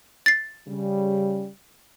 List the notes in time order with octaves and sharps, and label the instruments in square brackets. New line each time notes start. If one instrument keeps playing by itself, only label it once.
[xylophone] A6 C7
[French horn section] C#3 G3